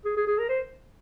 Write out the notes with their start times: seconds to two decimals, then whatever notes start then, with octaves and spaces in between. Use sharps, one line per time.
0.05 G#4
0.17 G#4
0.27 G#4
0.39 A#4
0.49 C5